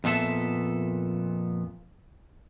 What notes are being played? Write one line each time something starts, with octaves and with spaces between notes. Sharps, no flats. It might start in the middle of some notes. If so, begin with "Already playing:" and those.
F2 A#2 B3 A4 E5